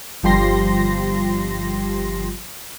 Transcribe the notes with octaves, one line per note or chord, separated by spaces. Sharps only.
G1 F3 G3 G4 C6 A#6